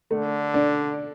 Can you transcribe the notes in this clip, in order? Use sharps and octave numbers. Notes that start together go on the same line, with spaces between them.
D3 A3
D4